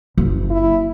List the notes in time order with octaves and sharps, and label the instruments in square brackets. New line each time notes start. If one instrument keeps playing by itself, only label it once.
[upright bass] F#1
[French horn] E4